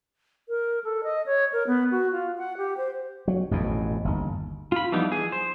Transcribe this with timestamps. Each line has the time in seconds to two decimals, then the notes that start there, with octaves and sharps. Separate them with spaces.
0.49 A#4
0.84 A4
1.04 D#5
1.26 C#5
1.53 A#4
1.67 B3
1.91 F#4
2.12 F4
2.38 F#5
2.57 G4
2.77 C5
3.28 F#3
3.51 A1 F2 B2
4.05 G1 D#2
4.72 F4 B5
4.92 E3 F3 G3 B3 D#4
5.12 G#4
5.32 C5